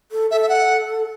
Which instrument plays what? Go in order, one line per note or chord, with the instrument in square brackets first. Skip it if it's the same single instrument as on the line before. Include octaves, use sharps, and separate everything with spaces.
[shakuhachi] A4
[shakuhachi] A4 [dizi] E5
[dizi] E5
F#5